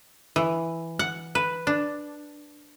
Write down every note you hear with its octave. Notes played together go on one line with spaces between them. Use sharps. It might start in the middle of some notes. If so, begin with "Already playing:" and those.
E3
F#5
B4
D4